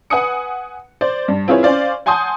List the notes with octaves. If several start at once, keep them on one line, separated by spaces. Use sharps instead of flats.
B4 F#5 G#5 D#6 C#7
C5 D5
G2
C4 E4 F4 G#4 B4 C#5
C#4 C5 D5 F5
F#5 G#5 A5 C6 D#6 G6